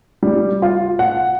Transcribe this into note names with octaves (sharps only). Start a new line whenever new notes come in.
G3
F4
F#5